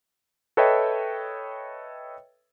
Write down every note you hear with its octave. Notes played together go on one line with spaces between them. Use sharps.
A4 B4 C#5 D#5 E5 G5